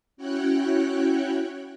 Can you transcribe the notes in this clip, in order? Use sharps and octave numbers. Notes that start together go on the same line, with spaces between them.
C#4 E4 F#4 C#5 G5 F#6